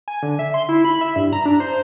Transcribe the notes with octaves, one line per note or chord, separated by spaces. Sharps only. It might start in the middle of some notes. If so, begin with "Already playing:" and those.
G#5
D3
E5
C6
E4
B5
E5
G2
A#5
D4
C5